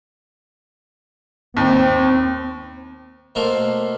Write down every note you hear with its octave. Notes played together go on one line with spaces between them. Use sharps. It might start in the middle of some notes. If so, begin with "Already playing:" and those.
D#2 C4
B2 A3 A#3 A#4 C5